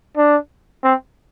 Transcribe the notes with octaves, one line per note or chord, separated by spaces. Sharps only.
D4
C4